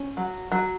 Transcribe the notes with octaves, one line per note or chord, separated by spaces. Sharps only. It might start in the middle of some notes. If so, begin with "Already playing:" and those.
Already playing: C#4
F#3
F#3